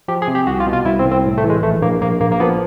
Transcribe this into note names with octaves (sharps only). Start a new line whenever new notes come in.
F3 G4
G#4
C3
G4
C2 F#4
F4
B2
F4
C2 E4
C4
C2
C4
A2
A3
E3
G#3
A#1 A3
A#1 A#3
A#1 A#3
A#1 A#3
A#3
F3 B3